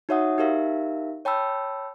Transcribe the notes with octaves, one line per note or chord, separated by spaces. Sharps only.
D#4 F#4 C#5 E5 F#5 D#6
D#4 G4 A#4 E5 F5
C#5 G5 A5 B5 E6